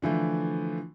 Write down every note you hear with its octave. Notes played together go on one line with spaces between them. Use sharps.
D3 E3 F3 A3